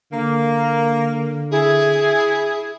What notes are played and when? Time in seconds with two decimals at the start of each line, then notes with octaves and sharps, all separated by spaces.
0.12 D3 A#3
1.51 E4 G#4